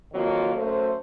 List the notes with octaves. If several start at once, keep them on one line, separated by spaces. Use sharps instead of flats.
F2 D#3 F#3 A#3 F4
F#2 A3 A4 C5